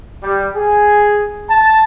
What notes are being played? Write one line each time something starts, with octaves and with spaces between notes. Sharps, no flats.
G3
G#4
A5